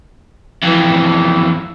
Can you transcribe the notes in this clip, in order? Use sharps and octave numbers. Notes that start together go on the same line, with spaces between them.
F2 E3